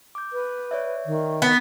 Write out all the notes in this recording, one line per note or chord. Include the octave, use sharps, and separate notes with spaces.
D6 G6
B4
C#5 D5 E5
D#3
B3 A6